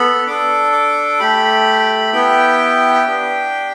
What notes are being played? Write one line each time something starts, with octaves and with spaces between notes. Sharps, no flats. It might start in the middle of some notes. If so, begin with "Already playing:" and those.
Already playing: B3 A4 B5
D4 A4 D6
D6
A3 G4 B5
B3 E4 G4 G5
D4 G4